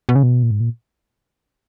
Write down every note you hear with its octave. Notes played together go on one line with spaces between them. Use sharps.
B2
C#3
B2
A#2
G#2
A#2